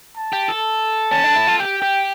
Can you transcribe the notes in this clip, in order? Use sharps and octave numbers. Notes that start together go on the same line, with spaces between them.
A5
G4
A4
C#4 A5
D4
E4
F4
G4 G5
G4